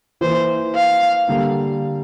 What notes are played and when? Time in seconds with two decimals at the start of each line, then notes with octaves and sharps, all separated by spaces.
0.21 E3 A#3 E4 C5
0.75 F5
1.28 D3 G3 A#3